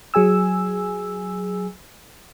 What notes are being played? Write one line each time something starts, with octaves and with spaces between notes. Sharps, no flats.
F#3 G#4 G#5 E6